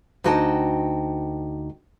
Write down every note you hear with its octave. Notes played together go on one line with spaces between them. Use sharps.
D2 D#4 F#4 D#5 G5 A5